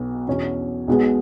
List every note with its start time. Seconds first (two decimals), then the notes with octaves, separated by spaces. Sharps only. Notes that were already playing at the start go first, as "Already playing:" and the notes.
Already playing: B1 B2 B3 F#4
0.28 E2 B2 F#3 C#4
0.88 B1 B2 G#3 B3 G#4